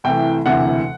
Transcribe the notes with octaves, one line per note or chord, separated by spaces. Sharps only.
C2 C3 E3 A3 G5
E1 D2 C3 E3 F#5